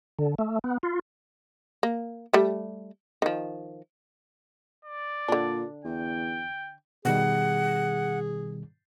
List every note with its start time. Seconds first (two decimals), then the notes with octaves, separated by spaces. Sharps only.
0.19 D3
0.38 A3
0.64 B3
0.83 F4
1.83 A#3
2.33 G3 A3
3.22 D#3 F3
4.85 D5
5.28 A#2 D3 D4
5.85 E2 G5
7.05 B2 D#3 G3 G#4 F#5